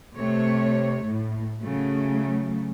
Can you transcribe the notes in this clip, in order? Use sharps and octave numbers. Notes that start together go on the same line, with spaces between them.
C3 A3 C#5
A2
C#3 F#3 A3